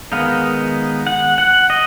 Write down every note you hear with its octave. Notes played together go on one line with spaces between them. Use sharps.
D#3 G#3 B3 D#4 F5
F#5
F#5
D#5